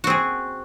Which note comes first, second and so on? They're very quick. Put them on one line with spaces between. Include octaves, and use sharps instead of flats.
F#4 C4 G#4